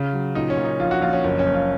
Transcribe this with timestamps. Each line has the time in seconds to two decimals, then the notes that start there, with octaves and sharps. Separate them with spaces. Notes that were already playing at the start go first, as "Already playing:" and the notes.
Already playing: C#3 F4
0.13 F#3
0.35 A#2 D#4
0.50 C#4
0.57 A#2
0.65 D#4
0.80 A#1 F4
0.91 F#4
1.02 A#1 F4
1.13 C#4
1.24 F#1 C#4
1.39 C#4
1.46 F#1
1.54 F4